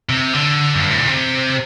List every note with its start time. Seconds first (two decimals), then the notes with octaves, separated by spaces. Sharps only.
0.09 C3
0.33 D3
0.75 F#2
0.82 G2
0.91 A2
0.99 A#2
1.07 C3